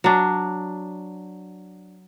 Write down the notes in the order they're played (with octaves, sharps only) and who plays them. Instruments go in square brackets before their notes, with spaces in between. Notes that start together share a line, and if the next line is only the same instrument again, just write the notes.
[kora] F#3 D4